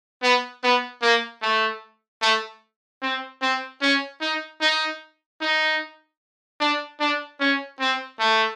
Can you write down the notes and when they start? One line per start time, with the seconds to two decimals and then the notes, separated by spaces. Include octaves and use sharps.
0.23 B3
0.63 B3
1.02 A#3
1.42 A3
2.22 A3
3.02 C4
3.42 C4
3.82 C#4
4.21 D#4
4.61 D#4
5.41 D#4
6.60 D4
7.00 D4
7.40 C#4
7.80 C4
8.19 A3